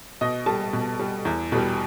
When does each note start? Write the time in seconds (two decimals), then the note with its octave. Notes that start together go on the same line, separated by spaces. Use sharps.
0.21 B2 D#5
0.46 G3 A5
0.73 B2
1.00 G3
1.25 E2
1.52 B2 G3